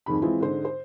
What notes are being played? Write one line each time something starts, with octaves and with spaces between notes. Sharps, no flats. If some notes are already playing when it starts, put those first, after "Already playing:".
F2 G#2 D#3 B5
E3 G#3 C4 E4 F4
G#2 D3 C5
C5